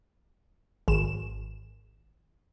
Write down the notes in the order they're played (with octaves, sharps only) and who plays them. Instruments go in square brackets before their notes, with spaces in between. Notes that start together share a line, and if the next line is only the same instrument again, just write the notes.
[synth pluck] G#1 E7